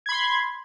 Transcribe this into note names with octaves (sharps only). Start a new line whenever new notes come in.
B5 C6 G#6